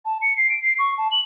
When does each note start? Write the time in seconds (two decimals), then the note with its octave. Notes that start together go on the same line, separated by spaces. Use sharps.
0.05 A5
0.22 C#7
0.37 C7
0.49 D7
0.63 C7
0.79 C#6
0.98 A5
1.11 F#7